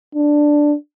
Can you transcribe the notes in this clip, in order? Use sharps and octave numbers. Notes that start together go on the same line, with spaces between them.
D4